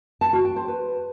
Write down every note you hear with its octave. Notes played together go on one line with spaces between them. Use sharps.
A5
F#4
G5
C5
B4